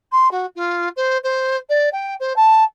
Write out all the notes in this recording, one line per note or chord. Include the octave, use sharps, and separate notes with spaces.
C6
F#4
F4
C5
C5
D5
G5
C5
A5